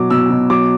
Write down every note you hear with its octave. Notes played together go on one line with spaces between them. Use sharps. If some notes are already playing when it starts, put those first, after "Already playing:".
Already playing: B2 F#3 D6
B2 E6
B2
F#3 D6